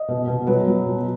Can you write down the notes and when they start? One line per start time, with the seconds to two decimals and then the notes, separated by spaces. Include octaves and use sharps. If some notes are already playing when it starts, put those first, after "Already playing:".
Already playing: D#5
0.08 B2
0.27 B2
0.47 F#3 B4
0.67 F#3
0.86 B2